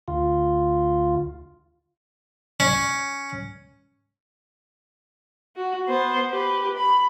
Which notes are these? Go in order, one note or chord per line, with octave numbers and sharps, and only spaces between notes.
D2 F4
C#4
F#4
B3 C5
G4 B4
B5